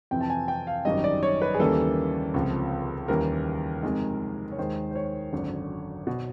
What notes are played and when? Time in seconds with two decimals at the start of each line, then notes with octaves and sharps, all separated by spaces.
0.11 F2 C3 E3 G5
0.21 A5
0.30 G#5
0.48 G5
0.67 F5
0.85 G#1 F#2 D#3 G3 D#5
1.04 D5
1.23 C#5
1.42 B4
1.54 G#4
1.59 D#2 C#3 E3 G3 A#3 A4
2.34 C#2 C3 F3
3.08 D#2 C#3 E3 G3 A#3 A#4
3.83 F2 C3 D#3 G#3
4.52 C#5
4.57 D#2 D#3 G#3 C5
4.91 C5
4.96 C#5
5.32 G#1 F#2 D3
6.07 B2